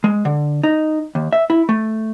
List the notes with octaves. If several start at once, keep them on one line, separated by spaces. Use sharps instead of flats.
G#3
D3
D#4
D#2
E5
E4
A3